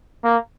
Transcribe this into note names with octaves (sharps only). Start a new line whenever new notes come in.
A#3